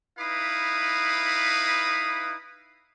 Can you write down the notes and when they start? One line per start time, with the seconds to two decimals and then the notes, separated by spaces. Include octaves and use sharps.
0.19 D#4 E4 B4 F5 B5 D#6